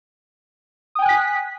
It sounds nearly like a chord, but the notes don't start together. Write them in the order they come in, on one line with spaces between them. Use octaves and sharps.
D#6 G5 G#5 F#6 B6